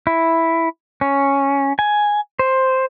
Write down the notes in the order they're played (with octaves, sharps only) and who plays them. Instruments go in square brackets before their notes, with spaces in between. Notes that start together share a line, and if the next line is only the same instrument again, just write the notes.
[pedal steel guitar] E4
C#4
G#5
C5